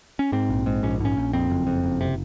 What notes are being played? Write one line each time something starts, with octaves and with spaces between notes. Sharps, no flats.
C#4
G#2 C4
A#1
G#2
A#1 C#4
G#2 C#4
A#1
F2 C4
F#1
F2
F#1
C3